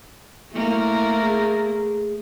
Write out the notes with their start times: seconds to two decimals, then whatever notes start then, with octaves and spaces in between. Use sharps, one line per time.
0.53 A3 A#3 E4
1.21 G#4